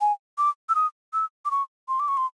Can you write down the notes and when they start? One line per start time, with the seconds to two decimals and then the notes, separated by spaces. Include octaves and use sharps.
0.01 G#5
0.38 D6
0.69 E6
0.75 D#6
1.13 E6
1.45 D6
1.51 C#6
1.88 C6
2.00 D6
2.08 C#6
2.17 C6